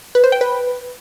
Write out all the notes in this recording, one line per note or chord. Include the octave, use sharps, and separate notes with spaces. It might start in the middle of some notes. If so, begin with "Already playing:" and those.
B4
C5
G5
B4